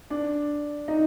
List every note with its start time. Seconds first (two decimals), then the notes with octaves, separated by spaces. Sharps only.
0.10 D4
0.88 D#4